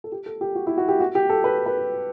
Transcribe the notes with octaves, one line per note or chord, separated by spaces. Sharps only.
A4
G4
A4
G4
F#4
E4
F#4
G4
F#4
G4
A4
B4
B4